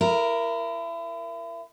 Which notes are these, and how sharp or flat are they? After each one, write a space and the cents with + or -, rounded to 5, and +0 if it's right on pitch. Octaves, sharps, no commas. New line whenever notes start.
E4 +35 A#4 +5